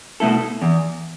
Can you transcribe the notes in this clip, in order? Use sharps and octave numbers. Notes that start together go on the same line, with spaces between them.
B2 A3 E4 A4
E2